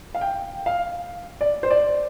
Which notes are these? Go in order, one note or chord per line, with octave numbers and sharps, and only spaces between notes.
F5
G5
F5
D5
C5
D5